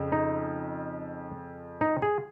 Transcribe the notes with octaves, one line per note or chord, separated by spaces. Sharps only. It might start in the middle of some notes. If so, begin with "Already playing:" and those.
Already playing: F2 C#3
D#4
D#4
G#4